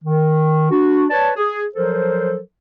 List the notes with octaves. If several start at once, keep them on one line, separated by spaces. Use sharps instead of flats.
D#3
D4 F#4
B4 C#5 D5 A5
G#4
F3 F#3 A4 A#4 C5